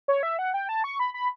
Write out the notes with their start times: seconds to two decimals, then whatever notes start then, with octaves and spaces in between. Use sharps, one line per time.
0.08 C#5
0.23 E5
0.39 F#5
0.54 G5
0.69 A5
0.84 C#6
1.00 B5
1.14 B5